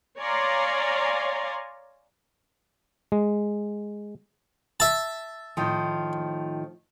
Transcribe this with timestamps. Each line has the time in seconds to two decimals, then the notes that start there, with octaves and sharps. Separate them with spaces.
0.19 C#5 D5 F5 G#5 A#5 C6
3.12 G#3
4.80 E5 A5
5.57 A2 D#3 F3